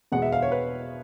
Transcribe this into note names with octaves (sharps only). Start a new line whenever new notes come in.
E2 B2 G#3 B3 F#5
E5
F5
C#5
B4